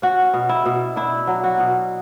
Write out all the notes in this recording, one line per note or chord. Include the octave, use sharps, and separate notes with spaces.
C#4 F#4
B2
E4
B2
D4 E4
F#3
F#4
B2